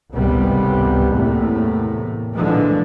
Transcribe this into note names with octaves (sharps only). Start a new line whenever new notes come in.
G#1 C#2 A2 C3 G3 B3
E2 A2 C3 A3 A#3
A#2 D3 E3 F3 G#3